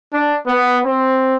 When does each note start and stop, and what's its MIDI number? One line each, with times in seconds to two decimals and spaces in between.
0.14 0.37 62
0.47 0.80 59
0.86 1.36 60